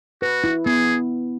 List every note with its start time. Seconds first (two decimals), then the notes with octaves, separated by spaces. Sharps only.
0.22 F#4 B4
0.44 E4
0.65 B3 G#4